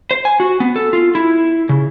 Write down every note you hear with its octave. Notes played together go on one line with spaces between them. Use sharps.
C5
G#5
F#4
B3
A4
F4
E4
C#3